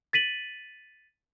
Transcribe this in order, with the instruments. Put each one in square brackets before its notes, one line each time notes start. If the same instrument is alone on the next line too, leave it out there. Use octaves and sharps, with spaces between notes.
[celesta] A6 B6 D#7 F#7